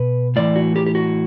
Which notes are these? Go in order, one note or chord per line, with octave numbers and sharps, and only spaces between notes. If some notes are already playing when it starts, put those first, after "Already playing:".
Already playing: B2 B4
A2 E3 D5
F#4
G4
G4
F#4